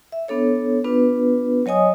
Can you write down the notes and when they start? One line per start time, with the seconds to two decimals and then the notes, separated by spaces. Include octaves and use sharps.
0.12 E5
0.28 B3 D4 A4 C#5
0.84 B3 D4 F4 B4
1.66 F#3 C#5 D#5 G#5 D#6